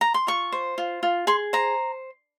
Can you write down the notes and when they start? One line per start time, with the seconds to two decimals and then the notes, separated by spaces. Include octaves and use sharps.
0.01 A#5
0.14 C6
0.27 F4 C#6
0.52 C5
0.78 F4
1.03 F4
1.27 G#4 C6
1.53 C5 A#5